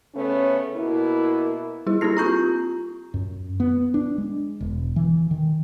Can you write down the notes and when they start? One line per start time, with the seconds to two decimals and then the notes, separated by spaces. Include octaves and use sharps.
0.15 C#3 A3 B3 C#4
0.76 B2 A#3 E4
1.86 G3 E4 G#4
2.01 A#3 D#4 E4 G4 A4 C7
2.17 C4 F4 G4 A#5 C#6 G6
3.14 F#2
3.60 B3
3.94 D4
4.18 G#3
4.61 E1
4.96 E3
5.31 D#3